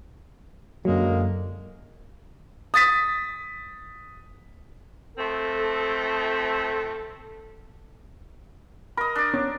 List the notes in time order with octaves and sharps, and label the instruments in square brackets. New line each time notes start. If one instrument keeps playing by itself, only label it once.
[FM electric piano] F#2 F#3 [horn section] D3 G#3 A#3
[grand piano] D#6 A6 B6
[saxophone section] F3 A3 C4 [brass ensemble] A4
[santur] A#4 D#5 [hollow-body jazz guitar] B5
[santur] D4 D5
[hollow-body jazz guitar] B3 C#4